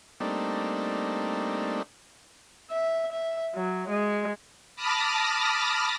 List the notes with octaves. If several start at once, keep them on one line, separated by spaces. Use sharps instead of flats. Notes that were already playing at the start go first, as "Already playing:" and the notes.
G3 A3 A#3 C4 D4 D#4
E5
E5
F#3
G#3
A5 B5 D6 D#6 F6 A#6